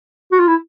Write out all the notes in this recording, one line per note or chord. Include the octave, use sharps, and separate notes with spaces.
F#4
F4
E4